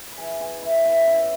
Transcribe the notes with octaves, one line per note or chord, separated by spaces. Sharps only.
B5
E3 G#4 G#5
B3 G#4 G#5
E3 E4 E5
B3 E4 E5
C#3 E4 E5